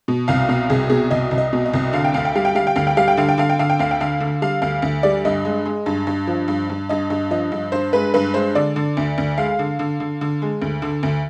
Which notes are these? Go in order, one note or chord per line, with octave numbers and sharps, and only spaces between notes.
B2
C2 F5
B2 F5
C2 G#4
B2 G#4
C2 D#5
C2
D#5
B2
D#5
C2
D3 F5
G5
D2 F5
G5
G3 F5
G5
G3 F5
G5
D2 F5
G5
G3 F5
G5
D3 F5
G5
D3 F5
G5
D3 F5
G5
D2 F5
G5
D3 F5
D3
G3 F5
D2 F5
D2
G3 D5
G2 D#5
G#3
G#3
G2
G2
F3
G2
G2
G2 D#5
G2
F3 D#5
G2
G2 C5
G#3 B4
G2 B4
G#3 C5
D3 D5
D3
D2
D2
G#3 F5
D3
D3
D3
D3
G#3
D2
D3
D2